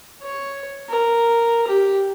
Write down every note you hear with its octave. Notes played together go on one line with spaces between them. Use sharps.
C#5
A#4
G4